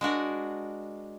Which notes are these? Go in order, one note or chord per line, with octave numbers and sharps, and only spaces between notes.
G#3 D4 F#4 A#4